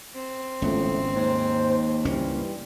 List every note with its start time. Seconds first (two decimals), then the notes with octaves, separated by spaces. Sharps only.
0.15 C4
0.62 G#1 C#2 A2 F3 A3 B3
1.16 D#2 G#2 C5
2.05 C#2 G2 E3 G3 A#3 C#4